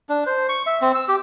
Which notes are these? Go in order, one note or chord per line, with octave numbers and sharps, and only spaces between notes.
D4
C5
C#6
E5
C4
E6
G4